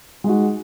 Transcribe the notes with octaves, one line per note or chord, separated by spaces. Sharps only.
G#3 D#4 F#4